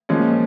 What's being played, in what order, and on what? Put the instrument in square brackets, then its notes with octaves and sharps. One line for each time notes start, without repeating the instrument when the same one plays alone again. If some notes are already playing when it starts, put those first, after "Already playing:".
[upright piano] A#2 F3 G#3 C#4